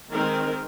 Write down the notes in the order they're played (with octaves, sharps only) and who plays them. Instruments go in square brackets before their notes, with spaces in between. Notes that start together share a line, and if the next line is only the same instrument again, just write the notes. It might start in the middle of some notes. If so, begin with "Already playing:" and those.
[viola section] D#3 G#3 C4 A#4